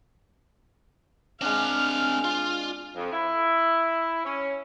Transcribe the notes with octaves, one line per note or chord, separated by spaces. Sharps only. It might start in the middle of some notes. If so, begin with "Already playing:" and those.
G#3 C4 D4 F5 F#5 F6
F4
F2
E4
C#4